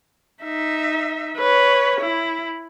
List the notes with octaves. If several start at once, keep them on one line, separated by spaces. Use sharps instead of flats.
D#4 E5
B4 C#5
E4